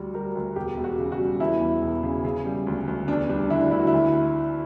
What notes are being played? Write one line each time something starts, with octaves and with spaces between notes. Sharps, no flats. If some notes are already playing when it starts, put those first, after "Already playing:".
Already playing: D2 G3 F#4
G3 A#4
D2
E1 G4
E1
F#4
C#3
F#4
G3
E2 E4
E2
E1
C#3
C#3
G3
D2
D2
E2 D4
G3 D4
D3 E4
D3 E4
F#4
E4
D2